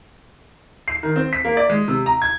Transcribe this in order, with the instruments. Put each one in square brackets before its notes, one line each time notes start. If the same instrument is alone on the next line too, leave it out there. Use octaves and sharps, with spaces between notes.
[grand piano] C7
D#3
C4
B6
A#3
D5
G#3
C3
A#5
G#6